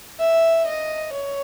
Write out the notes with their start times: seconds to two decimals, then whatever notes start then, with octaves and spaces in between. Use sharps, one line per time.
0.20 E5
0.66 D#5
1.12 C#5